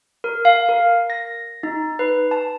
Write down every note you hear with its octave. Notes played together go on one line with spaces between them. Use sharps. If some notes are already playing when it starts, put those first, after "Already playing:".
A#4
F5
A#4
A#6
D#4
B4
A5